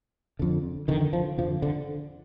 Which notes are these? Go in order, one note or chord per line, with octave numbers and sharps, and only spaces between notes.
F2 D3
F2 D3 D#3
F3
F2 D3 F3
D3